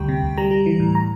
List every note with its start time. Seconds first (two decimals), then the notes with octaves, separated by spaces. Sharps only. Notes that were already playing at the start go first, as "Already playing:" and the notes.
Already playing: D2 G3 G5
0.08 C3
0.22 D2
0.37 G3 A#5
0.51 G3
0.66 E3
0.80 A2
0.95 A#5